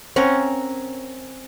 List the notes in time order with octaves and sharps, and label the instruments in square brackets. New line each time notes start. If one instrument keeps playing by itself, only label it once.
[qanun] C4 C#4 A#4 F#5